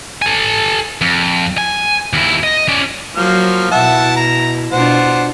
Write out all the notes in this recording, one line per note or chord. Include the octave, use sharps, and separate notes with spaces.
A4 G#5
F2
G#5
D#2 E4
D#5
C#4 D5
F3 F#3 A#3 F6
B2 E4 E5 F#5 A5
A#5
B2 D4 F4 C5 F#5